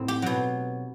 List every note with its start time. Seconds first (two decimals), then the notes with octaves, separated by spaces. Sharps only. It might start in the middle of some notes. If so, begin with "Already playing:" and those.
Already playing: A2 C4 D#4
0.08 G4
0.22 B2 F#3